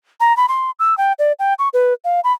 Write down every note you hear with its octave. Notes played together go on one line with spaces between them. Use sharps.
A#5
B5
C6
E6
G5
D5
G5
C#6
B4
F5
B5